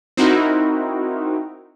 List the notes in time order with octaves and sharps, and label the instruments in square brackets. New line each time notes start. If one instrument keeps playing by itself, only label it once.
[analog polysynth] C4 D#4 E4 F#4 A#4